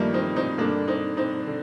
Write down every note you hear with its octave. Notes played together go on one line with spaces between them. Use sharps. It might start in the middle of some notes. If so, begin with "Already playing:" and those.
Already playing: G2 D#3 F3 G3 A3 A#3
C4 D#4
C4 D#4
G2 D3 A#3 D4
C4 D#4
C4 D#4
D3